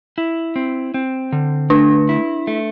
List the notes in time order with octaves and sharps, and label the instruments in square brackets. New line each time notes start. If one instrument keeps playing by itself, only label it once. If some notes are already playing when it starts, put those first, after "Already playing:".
[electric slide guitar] E4
C4
C4
D3
[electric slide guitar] A3 [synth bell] D4
[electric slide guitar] E4
A3